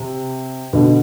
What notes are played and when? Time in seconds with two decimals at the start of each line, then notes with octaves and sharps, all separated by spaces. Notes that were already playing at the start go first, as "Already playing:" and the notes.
Already playing: C3
0.73 B2 D3